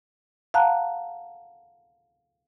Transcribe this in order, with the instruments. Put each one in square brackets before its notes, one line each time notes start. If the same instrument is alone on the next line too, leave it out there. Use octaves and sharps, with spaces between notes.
[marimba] F5 F#5 A5 A#5 F#6